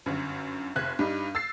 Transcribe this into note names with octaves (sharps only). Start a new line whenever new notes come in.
G1 F#2
F1 F#6 G#6
G2 G3 D#4
E6 A6 C7